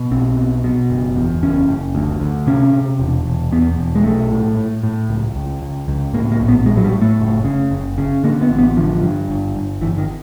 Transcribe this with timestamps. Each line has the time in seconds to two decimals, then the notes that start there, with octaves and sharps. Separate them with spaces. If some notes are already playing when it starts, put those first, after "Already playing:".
Already playing: B2
0.11 B1 C4
0.37 B2
0.64 B2
0.90 F#1
1.16 E2
1.42 F#1 C#4
1.69 F#1
1.95 D2
2.20 D2
2.47 C3 C#4
2.73 C3
2.99 E1
3.25 E1
3.51 E2 B3
3.78 E1
3.95 G#3
4.04 B1 A3
4.31 A2
4.57 A2
4.83 A2
5.09 C#2
5.36 C#2
5.62 C#2
5.88 C#2
6.13 A2 A#3
6.32 A#3
6.40 A#1
6.48 B3
6.66 A2 G#3
6.77 F#3
6.84 G3
6.93 A2
7.02 A3
7.19 F#1
7.45 C#3
7.71 F#1
7.98 C#3
8.24 D3 A#3
8.42 B3
8.50 A1
8.59 B3
8.77 D3 F3
9.03 G2
9.29 G1
9.55 G1
9.81 G1 E3
9.98 D#3